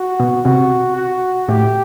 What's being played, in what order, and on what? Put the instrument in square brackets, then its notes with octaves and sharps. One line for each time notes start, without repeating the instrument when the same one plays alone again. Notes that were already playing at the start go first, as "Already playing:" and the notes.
Already playing: [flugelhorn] F#4
[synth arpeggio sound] B2 B3
[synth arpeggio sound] C3 C4 [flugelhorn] F#4
[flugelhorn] F#4
[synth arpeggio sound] A2 A3 [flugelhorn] G4